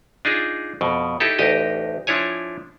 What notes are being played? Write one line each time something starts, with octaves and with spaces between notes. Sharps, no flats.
D4 D#4 F4 G#4
F2 B2
D#4 E4 G4 A4
A1 D2 D#4 G4 D#5
F3 D4 E4 C#5 G#5